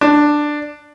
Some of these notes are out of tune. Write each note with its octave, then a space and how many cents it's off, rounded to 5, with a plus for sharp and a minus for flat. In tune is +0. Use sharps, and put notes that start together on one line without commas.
D4 +10